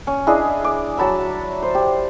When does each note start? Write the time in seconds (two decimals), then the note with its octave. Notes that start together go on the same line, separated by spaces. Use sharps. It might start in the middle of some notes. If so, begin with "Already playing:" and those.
0.07 C#4
0.27 D4 E4 G#4 D#5
0.64 D6
0.97 F#3 A5 B5 E6
1.62 C5
1.75 G4